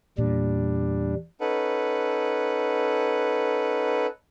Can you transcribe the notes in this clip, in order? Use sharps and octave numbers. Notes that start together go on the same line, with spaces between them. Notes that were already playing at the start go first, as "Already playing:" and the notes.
E2 A#2 G3 D4
C#4 D#4 A4 B4 F#5